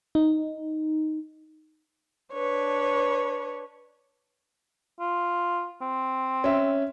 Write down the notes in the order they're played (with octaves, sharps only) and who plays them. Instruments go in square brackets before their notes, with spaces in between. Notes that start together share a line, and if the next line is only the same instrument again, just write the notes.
[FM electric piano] D#4
[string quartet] D4 B4 C#5
[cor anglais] F4
C4
[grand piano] C#4 E5